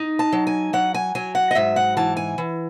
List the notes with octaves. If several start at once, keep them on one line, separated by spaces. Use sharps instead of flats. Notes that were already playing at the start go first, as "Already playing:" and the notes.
Already playing: D#4
A5
F#3
G#5
F#3 F#5
G#5
F#3 G#5
F#5
D#5
G#2 E5
F#5
E3 A5
G#5
E3